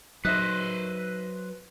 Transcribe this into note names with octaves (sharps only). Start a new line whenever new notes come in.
F#3 D#4 B4 C5 E5 F#6